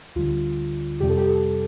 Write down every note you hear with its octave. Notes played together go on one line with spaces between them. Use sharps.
D2 D3 G3 F4
F2 C3 G3 G4
A4
G4
A4